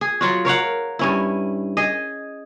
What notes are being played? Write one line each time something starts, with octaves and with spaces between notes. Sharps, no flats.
G#4
F#3 F4 F#4
A#4 C#5 F5 F#5
G2 C#4 E4
G#4 D#5